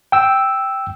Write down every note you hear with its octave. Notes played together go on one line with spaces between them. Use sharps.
G5 E6